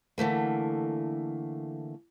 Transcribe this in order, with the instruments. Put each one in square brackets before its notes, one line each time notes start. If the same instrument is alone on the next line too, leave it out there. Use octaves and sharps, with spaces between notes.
[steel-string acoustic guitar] D3 E3 A3 A#3